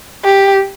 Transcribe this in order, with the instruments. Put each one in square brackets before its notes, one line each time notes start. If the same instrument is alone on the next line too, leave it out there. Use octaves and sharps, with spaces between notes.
[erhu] G4